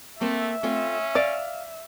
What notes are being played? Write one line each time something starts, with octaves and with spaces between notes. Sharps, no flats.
A3 A#3 C4 E5
A3 C4 C#4 F4
D5 F5